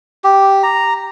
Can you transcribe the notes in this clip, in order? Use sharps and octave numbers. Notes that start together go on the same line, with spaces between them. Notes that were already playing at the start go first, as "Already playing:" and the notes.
G4
A#5